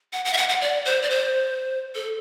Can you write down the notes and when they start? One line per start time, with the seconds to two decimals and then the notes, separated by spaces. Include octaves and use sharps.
0.13 F#5
0.25 F#5
0.33 E5
0.37 F#5
0.49 F#5
0.61 D5
0.85 C5
1.02 D5
1.10 C5
1.95 A4